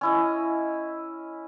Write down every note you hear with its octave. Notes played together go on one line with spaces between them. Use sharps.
C#4 E4 D#5